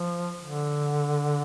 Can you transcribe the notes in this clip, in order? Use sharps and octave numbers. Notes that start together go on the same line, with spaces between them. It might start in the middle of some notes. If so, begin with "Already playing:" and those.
Already playing: F3
D3